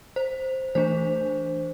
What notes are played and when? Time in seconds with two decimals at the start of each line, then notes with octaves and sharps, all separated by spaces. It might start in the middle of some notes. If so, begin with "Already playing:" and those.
0.16 C5
0.75 E3 A3 D4 C5